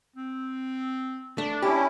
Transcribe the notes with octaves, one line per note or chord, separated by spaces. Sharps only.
C4
A3 D4
C#4 E4 G4